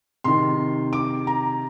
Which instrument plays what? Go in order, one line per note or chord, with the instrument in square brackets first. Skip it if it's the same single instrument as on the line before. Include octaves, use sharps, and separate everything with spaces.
[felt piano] C3 D#3 C6
D6
A#5